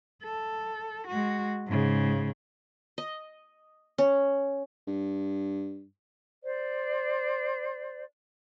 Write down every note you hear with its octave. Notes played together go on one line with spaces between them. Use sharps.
A4
G#3 F#4
G#2 C#3
D#5
C#4
G2
C5 D5